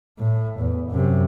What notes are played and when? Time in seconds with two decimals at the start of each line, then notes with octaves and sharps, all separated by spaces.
0.19 A2
0.60 E2
0.91 F#2 C3